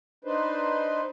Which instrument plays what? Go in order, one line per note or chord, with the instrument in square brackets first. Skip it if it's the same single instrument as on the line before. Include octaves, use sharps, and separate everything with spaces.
[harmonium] D4 D#4 B4 C5